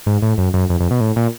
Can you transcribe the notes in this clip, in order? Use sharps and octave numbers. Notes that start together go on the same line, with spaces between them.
G#2
A2
F#2
F#2
F2
F2
B2
A2
A#2